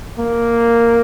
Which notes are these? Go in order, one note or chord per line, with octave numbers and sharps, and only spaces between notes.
A#3